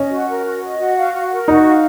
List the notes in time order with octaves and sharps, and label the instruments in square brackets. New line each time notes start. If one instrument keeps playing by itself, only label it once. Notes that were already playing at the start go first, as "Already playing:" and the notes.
Already playing: [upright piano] C#4 [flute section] D#5
[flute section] F#4
A#4
F#4
D#5
F#4
F5
F#4
A#4
[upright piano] D#4 [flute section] F#4
[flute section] F5